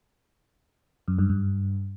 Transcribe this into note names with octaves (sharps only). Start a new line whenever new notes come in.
F#2
G2
G2